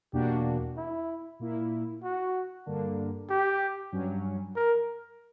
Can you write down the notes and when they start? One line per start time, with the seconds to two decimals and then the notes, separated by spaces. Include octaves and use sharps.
0.13 E2 B2 A#3 D4 F#4 G4
0.77 E4
1.40 A#2 A#3 E4
2.03 F#4
2.66 G2 D3 A#3 D4
3.30 G4
3.92 G2 F#3 C#4
4.56 A#4